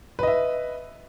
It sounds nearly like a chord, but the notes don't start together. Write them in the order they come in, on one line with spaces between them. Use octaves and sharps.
B4 D#5 E5